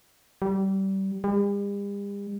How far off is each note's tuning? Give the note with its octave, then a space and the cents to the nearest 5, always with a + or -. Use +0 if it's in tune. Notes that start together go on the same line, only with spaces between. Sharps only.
G3 -25
G3 +45